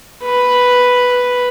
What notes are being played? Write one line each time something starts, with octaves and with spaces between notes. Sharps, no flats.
B4